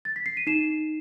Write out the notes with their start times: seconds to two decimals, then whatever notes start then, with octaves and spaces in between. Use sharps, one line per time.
0.05 A6
0.16 B6
0.26 C7
0.37 D#7
0.47 D#4 C7 E7